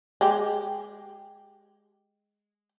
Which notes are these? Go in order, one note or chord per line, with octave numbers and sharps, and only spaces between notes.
G#3 G4